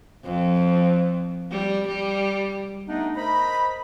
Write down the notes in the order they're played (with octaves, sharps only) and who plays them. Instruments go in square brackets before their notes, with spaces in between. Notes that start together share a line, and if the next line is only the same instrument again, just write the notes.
[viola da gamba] F2
G3
G3
[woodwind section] A3 B3 D4 D#4
A#4 C5 D#5 A#5 B5